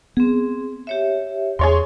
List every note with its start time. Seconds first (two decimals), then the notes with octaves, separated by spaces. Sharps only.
0.17 B3 C4 G#4
0.87 G4 C#5 E5
1.59 E2 G#4 C#5 C6